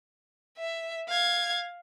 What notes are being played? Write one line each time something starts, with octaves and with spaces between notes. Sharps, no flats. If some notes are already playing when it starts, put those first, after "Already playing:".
E5
F5 G#6